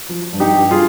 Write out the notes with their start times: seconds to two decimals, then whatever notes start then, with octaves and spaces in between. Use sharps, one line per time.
0.09 F3
0.33 G2
0.40 D#4 G4
0.56 G2
0.71 F4 G#4